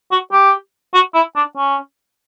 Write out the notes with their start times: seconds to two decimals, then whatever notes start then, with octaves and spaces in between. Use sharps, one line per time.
0.11 F#4
0.32 G4
0.94 F#4
1.14 E4
1.36 D4
1.57 C#4